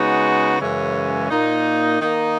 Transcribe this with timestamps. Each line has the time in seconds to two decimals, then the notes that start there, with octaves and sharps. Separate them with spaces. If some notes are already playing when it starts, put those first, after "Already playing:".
Already playing: C#3 G#3 B3 D#4 F#4
0.60 F#2 C#3 E3 G#3 C#4
1.31 A#2 A#3 D#4
2.00 D#3 A#3 D#4